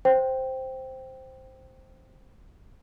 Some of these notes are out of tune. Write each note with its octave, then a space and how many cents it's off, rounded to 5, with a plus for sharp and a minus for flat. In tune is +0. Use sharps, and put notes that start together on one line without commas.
C5 +0 G5 -5